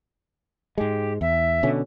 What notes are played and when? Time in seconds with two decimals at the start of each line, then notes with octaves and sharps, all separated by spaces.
0.78 G#2 G#3 G4
1.21 E2 E5
1.63 B2 D3 C#4